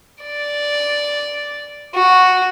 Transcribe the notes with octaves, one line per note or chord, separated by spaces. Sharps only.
D5
F#4